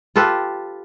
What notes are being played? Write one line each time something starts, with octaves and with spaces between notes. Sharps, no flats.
F4 G4 A4 B4